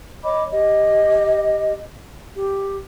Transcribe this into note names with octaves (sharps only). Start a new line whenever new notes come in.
C#5 D#5 B5 D6
G4 D#5
G4